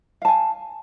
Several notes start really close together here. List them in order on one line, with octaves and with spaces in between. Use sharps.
F5 A5 G#5